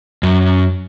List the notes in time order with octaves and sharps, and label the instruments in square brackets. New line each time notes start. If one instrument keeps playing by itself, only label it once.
[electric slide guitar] F#2